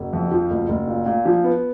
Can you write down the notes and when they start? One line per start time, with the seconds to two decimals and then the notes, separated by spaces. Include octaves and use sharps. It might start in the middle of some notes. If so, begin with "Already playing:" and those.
Already playing: F#1
0.13 F2
0.31 F3
0.50 F#1
0.68 F#1
0.87 A#2
1.06 A#2
1.25 F3
1.44 B3